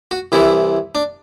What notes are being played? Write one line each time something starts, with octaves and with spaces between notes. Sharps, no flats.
F#4
C2 C3 E3 E4
D4